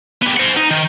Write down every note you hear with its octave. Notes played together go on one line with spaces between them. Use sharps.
B3 G4
C5 F#5
D#4
D#3